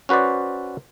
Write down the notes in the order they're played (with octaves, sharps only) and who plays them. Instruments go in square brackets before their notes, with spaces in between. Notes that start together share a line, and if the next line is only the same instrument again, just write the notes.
[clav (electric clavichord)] C#4 F#4 B4 C5 D5